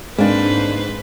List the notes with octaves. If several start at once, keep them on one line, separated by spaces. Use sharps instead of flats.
G#2 G#3 A#3 C4 D4 B4 C5